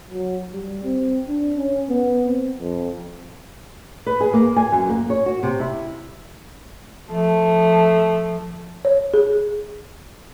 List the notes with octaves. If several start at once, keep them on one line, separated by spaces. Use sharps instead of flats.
F#3
G3
C4
D4
C#4
B3
C4
F2
B4
G#4
A#3
G#5
F#2
A#3
C#5
F#4
C3
E4
F3 A3
C#5
G#4